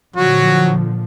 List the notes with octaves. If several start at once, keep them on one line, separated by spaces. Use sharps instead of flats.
A#2 D3 F3 F#3 F#4